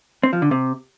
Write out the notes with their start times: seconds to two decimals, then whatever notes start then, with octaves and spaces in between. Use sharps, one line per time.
0.23 C4
0.33 F3
0.42 D3
0.51 C3